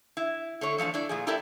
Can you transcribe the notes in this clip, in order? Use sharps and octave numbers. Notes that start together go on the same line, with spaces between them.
E4
D3 A3 C#5
E3 F3 A3 D4
D4 E4 D5
A#2 F3 G#4
E4 G4 A4 A#4 D5 E5